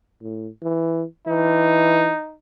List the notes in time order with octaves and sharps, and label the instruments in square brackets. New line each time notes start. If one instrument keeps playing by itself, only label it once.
[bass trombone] A2
E3
[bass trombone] E3 [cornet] D#4